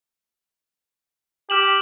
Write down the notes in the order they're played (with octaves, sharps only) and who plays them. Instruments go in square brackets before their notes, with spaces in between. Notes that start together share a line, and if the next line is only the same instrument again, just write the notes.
[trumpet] G4 [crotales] F6 E7 F#7